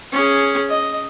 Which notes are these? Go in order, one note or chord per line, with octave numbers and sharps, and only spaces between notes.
C#4 G#4
D#5